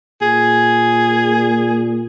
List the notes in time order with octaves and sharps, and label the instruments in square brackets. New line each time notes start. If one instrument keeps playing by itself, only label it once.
[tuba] A#2 [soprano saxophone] G#4